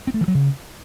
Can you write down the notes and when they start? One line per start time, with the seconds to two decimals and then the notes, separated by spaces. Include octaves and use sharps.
0.07 C4
0.14 A3
0.21 E3
0.28 F#3
0.35 C#3